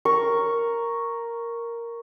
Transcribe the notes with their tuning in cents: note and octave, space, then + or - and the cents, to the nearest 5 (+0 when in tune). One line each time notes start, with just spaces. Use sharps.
A#4 +0 C#6 +0